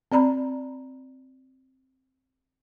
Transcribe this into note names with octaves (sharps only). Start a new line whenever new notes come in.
C4 D5 A#5 B5